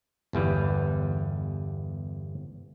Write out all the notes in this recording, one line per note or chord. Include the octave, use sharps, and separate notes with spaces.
G1 E2 G3 B4